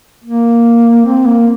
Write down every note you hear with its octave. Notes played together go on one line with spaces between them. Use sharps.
A#3
C4
A#3